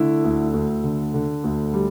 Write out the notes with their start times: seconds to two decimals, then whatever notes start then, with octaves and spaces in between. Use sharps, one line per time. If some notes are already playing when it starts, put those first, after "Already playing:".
Already playing: D3 A3 E4
0.24 D2
0.53 D2
0.84 D3
1.14 D3
1.44 D2
1.74 G3